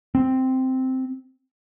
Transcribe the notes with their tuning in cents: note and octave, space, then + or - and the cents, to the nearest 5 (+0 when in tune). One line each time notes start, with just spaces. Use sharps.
C4 -5